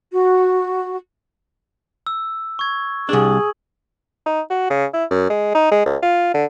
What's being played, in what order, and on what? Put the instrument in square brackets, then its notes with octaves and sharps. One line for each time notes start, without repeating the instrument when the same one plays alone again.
[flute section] F#4
[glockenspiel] E6
C#6 G#6
[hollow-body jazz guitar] C2 D4 [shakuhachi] G#4 [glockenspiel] F#7
[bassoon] D#4
F#4
C#3
E4
F#2
G#3
D#4
G#3
C#2
F4
D3